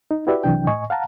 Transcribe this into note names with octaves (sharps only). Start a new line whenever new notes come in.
D#4
E4 F#4 G4 B4 D5 E5
C2 C3 E3 F#3 D4 G5
A2 D#5 G#5 C#6
F5 F#5 A5 A#5